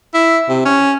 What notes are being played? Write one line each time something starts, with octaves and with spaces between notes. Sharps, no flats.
E4
C3
C#4